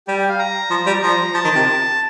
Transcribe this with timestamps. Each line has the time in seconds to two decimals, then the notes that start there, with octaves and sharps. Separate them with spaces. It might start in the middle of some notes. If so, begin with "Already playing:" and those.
0.07 G3 G4
0.18 G4
0.29 F5
0.39 A#5
0.70 F3
0.86 G3
1.02 F3 A#5
1.34 F3 A5
1.44 D#3
1.55 C3